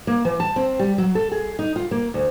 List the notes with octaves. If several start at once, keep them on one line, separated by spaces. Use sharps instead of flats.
A#3
E3
A5
C4
G3
F#3
A4
G#4
D#4
F4
A#3
D2